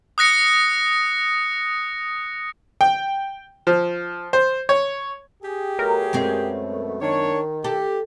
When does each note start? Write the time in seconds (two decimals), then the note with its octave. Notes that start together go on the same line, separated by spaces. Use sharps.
0.18 D#6 F#6 A#6 C#7
2.81 G5
3.67 F3
4.33 C5
4.69 C#5
5.43 G4 G#4
5.79 B2 F#3 A3 A#4
6.13 F#2 G#3 C4
7.01 D#3 D4 C#5
7.64 G4 A4